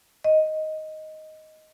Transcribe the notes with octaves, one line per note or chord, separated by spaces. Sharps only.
D#5